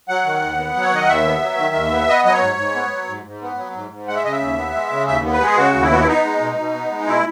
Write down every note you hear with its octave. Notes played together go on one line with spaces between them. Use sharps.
F#3 F#5
D#3
D#2
B3
F#3
C#5
D#3 D#5
D#2 E5
B3
F#3
D#3
D#2
B3
B3 D#5
F#3 D#5
C#5
G#2
G#2
B3
F#3
G#2
G#2
B3
F#3
G#2
G#2
G#3 F#5
E5
C#3 D#5
E5
D#2
B3
G#3
C#3
D#2 E5
B3
B4
G#3 G#4
C#3 F#4
D#2
E4
B3 F#4
E4
B3 D#4
G#3
B2
B2
B3
G#3
B2 E4